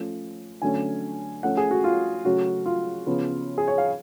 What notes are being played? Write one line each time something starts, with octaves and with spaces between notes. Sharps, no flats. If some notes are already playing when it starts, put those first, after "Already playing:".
Already playing: F3 A3 C#4
D3 F#3 A3 C#4 G#5
F3 A3 C#4 F#5
G#4
F#4
F4
C#3 F#3 A3 C#4 F#4
F4
C#3 F3 B3
G#4
C#5
F5